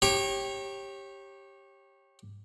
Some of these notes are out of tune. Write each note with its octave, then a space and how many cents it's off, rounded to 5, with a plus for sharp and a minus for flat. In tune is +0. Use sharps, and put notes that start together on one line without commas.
G4 +0 C#5 -25 A#5 +0